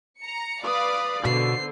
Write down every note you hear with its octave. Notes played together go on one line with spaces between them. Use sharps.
A#5 C#7
B4 D5 F5 D#6
B2 D3 C5 C7